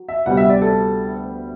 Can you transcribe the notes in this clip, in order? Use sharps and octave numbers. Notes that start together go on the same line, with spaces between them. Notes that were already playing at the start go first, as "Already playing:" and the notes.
Already playing: F#3
E5
D2 C3 G3 B3 F#5
E5
D5
A4